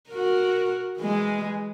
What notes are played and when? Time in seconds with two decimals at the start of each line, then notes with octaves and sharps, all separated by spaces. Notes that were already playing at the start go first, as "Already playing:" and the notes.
0.10 F#4 A#4
0.97 E3 G#3